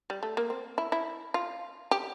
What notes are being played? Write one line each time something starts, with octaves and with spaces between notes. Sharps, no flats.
G3
A3
A#3
C4
E4
E4
F4
G4